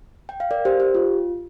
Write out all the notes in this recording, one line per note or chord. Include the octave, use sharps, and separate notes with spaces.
G5
F5
A#4 D5
G4 C5
G4
F4